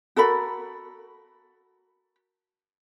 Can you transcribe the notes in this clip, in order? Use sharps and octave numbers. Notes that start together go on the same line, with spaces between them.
F#4 A4 A#4 B5